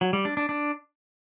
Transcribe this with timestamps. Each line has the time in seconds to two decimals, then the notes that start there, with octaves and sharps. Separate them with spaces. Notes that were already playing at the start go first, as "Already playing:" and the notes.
0.01 F#3
0.13 G3
0.25 D4
0.37 D4
0.49 D4